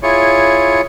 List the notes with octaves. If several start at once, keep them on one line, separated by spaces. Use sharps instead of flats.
E4 F4 G#4 C#5